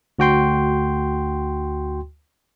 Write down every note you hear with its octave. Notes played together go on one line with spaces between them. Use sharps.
D2 F#4 G5 C6